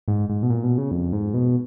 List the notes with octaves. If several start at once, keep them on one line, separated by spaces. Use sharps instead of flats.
G#2
G#2
B2
A#2
B2
C#3
F2
G#2
B2